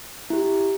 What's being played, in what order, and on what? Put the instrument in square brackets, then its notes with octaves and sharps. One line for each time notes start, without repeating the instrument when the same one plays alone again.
[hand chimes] E4 G4